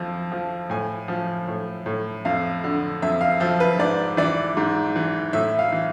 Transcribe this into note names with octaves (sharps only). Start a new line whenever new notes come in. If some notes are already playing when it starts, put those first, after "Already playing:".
Already playing: F2 F3
F3
A2 G#5
F3
A2
A2
F2 F5
D3
F2 E5
F5
F3 E5
B4
G#2 D5
E3 D5
G#2
E3
A2 E5
F5
E3